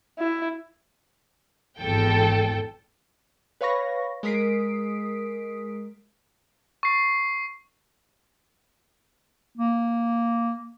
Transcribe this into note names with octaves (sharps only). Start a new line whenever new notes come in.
E4
G#1 E2 A4 G5
B4 C#5 F5 B5 C#6 A#6
G#3 A#4 D#6 B6 C7 D7
C#6 C7
A#3